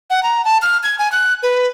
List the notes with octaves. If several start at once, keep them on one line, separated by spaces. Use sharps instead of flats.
F#5
A#5
A5
F6
G#6
G#5
F#6
B4